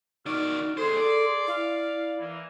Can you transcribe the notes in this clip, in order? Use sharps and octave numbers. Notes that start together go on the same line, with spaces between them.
D#3 D#4 F#4 D5 F6
D#2 G#4 A4 C5 C6
D5
E4 F5
E3 A#3